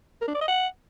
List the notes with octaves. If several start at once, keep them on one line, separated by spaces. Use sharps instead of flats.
A#4
D4
D5
D#5
F#5